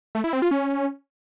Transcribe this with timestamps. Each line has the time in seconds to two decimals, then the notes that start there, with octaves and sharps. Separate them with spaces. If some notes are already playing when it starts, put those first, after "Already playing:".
0.15 A3
0.24 E4
0.33 C4
0.42 F4
0.51 C#4